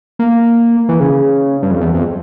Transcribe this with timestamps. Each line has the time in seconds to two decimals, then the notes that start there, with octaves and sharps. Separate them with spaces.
0.19 A#3
0.89 E3
1.00 C#3
1.62 G2
1.71 F2
1.81 E2
1.95 F2